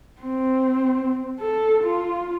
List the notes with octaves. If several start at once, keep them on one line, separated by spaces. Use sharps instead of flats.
C4
A4
F4